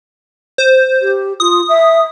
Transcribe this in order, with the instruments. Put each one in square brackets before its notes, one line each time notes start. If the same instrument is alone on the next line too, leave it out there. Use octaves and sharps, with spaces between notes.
[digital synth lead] C5
[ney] G4
[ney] F4 [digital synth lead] D#6
[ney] E5